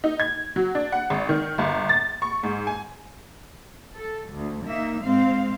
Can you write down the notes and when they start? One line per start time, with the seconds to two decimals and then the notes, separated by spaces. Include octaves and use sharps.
0.04 D#4
0.20 G#6
0.56 F#3
0.75 D4
0.92 F#5
1.10 G#1
1.29 D#3
1.58 G1
1.89 A6
2.22 C#6
2.43 G#2
2.67 G#5
3.97 A4
4.32 D2
4.67 A#3 D#4 E5
5.02 G#2 G#3 C4 F5